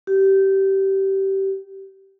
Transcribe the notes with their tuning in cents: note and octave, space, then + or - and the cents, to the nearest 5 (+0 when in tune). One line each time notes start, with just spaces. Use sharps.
G4 -20